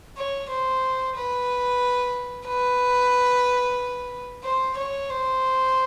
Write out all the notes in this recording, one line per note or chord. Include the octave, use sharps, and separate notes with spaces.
C#5
C5
B4
B4
C5
C#5
C5